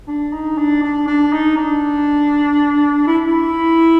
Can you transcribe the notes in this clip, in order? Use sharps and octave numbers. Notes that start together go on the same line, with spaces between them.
D4
D#4
D4
D4
D4
D#4
D4
E4
E4